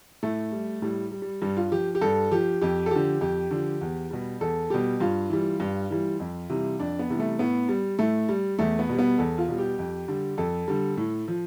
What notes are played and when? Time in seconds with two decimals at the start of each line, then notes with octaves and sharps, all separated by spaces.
0.23 A2 A3
0.52 G3
0.82 A2 G3
1.11 G3
1.22 G3
1.42 G2 G3
1.57 F4
1.72 F3 G4
1.95 G4
2.01 G2 A4
2.31 F3 G4
2.61 F2 G4
2.86 A4
2.91 D3 F3 G4
3.21 F2 G4
3.51 D3 F3
3.81 E2
4.11 B2 G3
4.41 E2 A4
4.70 B2 G3 G4
5.00 G2 F4
5.30 E3 G3
5.60 G2
5.90 E3 G3
6.20 F2
6.50 C3 E3 G3
6.80 F2 D4
6.99 B3
7.10 C3 E3 G3
7.20 A3
7.39 A2 B3
7.69 G3
7.99 A2 A3
8.29 G3
8.59 E2 A3
8.79 B3
8.89 B2 G3
8.99 B3
9.18 E2 A4
9.38 F4
9.48 B2 G3
9.58 G4
9.78 F2
10.08 D3 G3
10.38 F2 A4
10.68 D3 G3
10.97 A2
11.28 F3